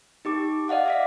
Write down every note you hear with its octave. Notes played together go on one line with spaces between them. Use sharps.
D#4 G4 D6
D5 D#5 F5 F#5 D6
E5 D6 B6